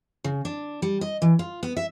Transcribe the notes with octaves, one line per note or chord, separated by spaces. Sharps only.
C#3
D4
G3
D#5
E3
F4
B3
E5